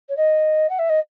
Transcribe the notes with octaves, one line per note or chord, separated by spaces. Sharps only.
C#5
D#5
F#5
E5
D#5